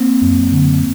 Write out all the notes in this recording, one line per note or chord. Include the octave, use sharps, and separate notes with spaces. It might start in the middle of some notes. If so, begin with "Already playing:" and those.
Already playing: A#3 C4
F#2
D3